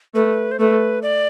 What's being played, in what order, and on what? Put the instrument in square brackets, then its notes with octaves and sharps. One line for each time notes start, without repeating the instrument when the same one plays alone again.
[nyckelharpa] A3 [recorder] B4
[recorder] C5
[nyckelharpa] A3 [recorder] B4
[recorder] D5